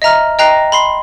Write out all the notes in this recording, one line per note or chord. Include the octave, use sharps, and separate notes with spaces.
D#5 E5 A#5 F6
D#5 G5 A#5 F#6 A#6 C7
B5 C6 C7